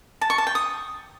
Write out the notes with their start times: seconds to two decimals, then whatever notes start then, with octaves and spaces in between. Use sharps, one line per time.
0.21 A5
0.30 C#6
0.38 A5
0.47 G5
0.55 D#6